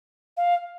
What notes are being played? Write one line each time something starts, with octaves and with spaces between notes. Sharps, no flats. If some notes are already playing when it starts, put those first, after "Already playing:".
F5